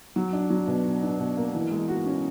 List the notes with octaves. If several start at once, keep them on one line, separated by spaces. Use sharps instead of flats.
F#3
D4
F#3
B2
D4
D4
B2
A#3
E3
G#3
F#4
C#4